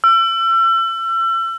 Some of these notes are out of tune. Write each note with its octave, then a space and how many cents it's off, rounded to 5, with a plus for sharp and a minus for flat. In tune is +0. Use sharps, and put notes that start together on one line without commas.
E6 +35